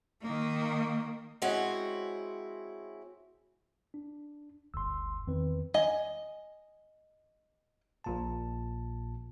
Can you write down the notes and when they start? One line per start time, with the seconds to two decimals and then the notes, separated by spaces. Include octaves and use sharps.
0.22 D#3 A#3
1.42 G#3 C4 C#4 E4 F#4
3.94 D4
4.74 G1 D2 C6 E6
5.27 E2 D#3 C4 B4
5.74 D#5 G#5
8.04 A#1 A#2 A5